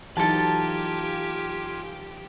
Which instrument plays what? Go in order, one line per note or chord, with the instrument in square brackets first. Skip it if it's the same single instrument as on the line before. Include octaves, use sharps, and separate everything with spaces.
[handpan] E3 F#3 D#4 [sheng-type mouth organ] F4 G#5 [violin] G4 [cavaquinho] A4 A5